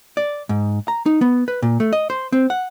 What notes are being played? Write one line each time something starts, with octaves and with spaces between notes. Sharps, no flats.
D5
G#2
A#5
D#4
B3
B4
A#2
A3
D#5
C5
C4
F#5